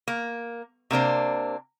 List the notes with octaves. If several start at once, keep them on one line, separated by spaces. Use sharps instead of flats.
A#3
C3 A#3 D4 C5